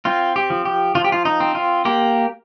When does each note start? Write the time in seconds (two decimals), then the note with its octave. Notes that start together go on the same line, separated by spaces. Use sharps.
0.05 C4 F4
0.36 G4
0.50 F3
0.65 G4
0.95 F3 F4
1.04 G4
1.12 F4
1.25 D#4
1.40 C4
1.55 F4
1.85 A#3 G4